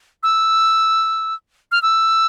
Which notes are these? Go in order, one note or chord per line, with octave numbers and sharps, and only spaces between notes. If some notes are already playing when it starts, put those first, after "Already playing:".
E6
F6
E6